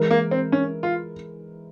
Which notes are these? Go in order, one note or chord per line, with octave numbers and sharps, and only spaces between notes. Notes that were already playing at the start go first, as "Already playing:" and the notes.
Already playing: E3 G#3 E4 A#4
A#3
C4
C#4
F4